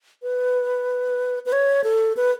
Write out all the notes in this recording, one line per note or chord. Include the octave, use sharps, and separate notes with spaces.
B4
B4
C#5
A4
B4